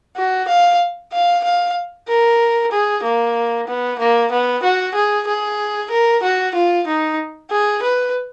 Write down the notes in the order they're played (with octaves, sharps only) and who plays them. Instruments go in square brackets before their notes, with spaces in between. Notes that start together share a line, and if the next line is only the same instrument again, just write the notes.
[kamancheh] F#4
F5
F5
F5
A#4
G#4
A#3
B3
A#3
B3
F#4
G#4
G#4
A#4
F#4
F4
D#4
G#4
B4